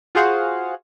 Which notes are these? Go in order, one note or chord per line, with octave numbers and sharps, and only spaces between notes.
F4 F#4 G#4 C5 F5 F#5